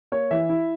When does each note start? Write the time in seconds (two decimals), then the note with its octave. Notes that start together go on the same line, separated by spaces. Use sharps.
0.12 A#3 C#5
0.31 E3 E5
0.49 E4